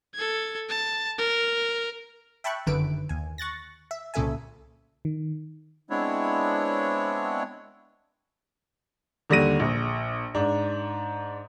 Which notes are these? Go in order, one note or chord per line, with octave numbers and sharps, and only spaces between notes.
A4 G#6
A5
A#4
E5 G5 A5 B5 C#6 F#6
G1 F#2 D3 D#3 B4 D7
D#2 G#5
C#6 F#6 A6 A#6
E5
C2 A#2 C#3 A4 E5 G#5
D#3
G#3 B3 C4 D4 E4 C#5
D#2 D3 G3 A#6 D#7
A#1
G#2 D4